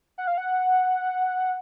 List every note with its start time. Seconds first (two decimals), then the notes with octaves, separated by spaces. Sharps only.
0.18 F#5
0.27 F5
0.38 F#5